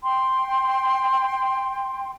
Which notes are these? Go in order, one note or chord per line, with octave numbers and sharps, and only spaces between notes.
G5 C6